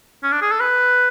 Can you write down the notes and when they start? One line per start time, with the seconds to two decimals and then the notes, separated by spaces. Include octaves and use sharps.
0.23 C#4
0.32 D4
0.42 G#4
0.52 A4
0.60 B4